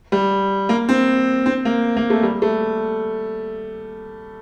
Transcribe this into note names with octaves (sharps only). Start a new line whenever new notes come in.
G3
A#3
C4
C4
A#3
A#3
A3
G3
A3